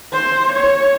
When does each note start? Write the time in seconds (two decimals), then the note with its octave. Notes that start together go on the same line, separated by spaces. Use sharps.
0.13 C5
0.52 C#5